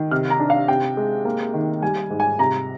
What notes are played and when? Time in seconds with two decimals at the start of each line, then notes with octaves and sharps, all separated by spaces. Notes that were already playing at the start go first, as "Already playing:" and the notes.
Already playing: D#3
0.11 C3 F6
0.30 A#5
0.40 D4
0.50 F5
0.68 C3 G5
0.97 G#3
1.25 A#3
1.54 D#3
1.82 G3 G#5
2.10 G#2
2.20 G#5
2.39 C3 A#5